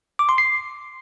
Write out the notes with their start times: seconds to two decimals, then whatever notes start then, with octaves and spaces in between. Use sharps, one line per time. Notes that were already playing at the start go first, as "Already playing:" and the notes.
0.19 D6
0.29 C6
0.38 C7